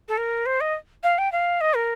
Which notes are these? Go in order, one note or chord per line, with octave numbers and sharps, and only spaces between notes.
A4
A#4
C5
D#5
F5
G5
F5
D#5
A#4